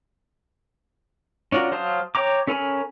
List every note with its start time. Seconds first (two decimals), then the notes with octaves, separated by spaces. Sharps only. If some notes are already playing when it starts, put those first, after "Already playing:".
1.52 C#4 D4 F4 F#4 A#4
1.72 F#3 C5 F5 A5 D#6
2.15 C#5 G5 A#5 D6
2.47 C#4 A4 A#4 G#5 B5